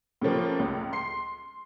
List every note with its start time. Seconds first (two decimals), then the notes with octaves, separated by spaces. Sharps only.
0.22 A2 C#3 F3 A#3
0.59 C#2
0.93 C6 C7